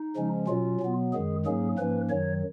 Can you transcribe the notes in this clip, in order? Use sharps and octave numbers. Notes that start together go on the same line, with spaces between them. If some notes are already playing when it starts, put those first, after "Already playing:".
Already playing: D#4
C#3 F3 G#3 C#4
B2 F#3 C#4 F4
B2 F#3 B3
F#2 D#3 G#3 G#4
G#2 F#3 A#3 C#4 G#4
G#2 F3 A#3 C#4 B4
F#2 D#3 F#3 C#5